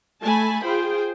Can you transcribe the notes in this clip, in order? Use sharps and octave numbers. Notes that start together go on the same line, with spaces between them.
A3 A4 G#5 A5 B5
F4 G#4 C5 G5